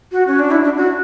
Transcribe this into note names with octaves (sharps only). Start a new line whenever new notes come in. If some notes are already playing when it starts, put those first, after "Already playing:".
F#4
C#4
D4
E4
D4
F#4